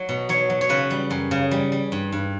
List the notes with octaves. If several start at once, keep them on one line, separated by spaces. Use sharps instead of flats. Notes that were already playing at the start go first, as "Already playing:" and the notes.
Already playing: F#3
B2
F#3 C#5
F#3
C#5
C#3 B4
G3
F#2
C#3
G3
G3
G2
G2